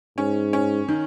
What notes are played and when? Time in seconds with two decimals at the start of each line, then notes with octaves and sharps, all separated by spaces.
0.18 G#2 C#4
0.53 C#4
0.89 D#3